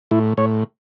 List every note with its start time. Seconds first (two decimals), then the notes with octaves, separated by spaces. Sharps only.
0.11 A2 E4
0.37 A2 C#5